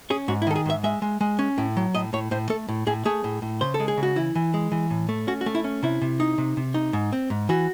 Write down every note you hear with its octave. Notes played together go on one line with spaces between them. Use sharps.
C#4 G#4
G#2 F#4
E4
D#3 A4
G#4
G#2 E5
G#3 E5
G#3
G#3
C#4
A2
F#3
A2 D#5
A2 C#5
A2 C5
A3 A4
A2
A2 G#4
A3 G#4
A2
A2
C#3 C5
A4
G#3
G#4
C#3
F#4
E3 E4
E3
G#3
E3
A2
A3
C#4 F#4
F#4
A3
E4
C#4
C3 E4
C3
D#4
C3
C3
D#4
G#2
C4
G#2
E3 F#4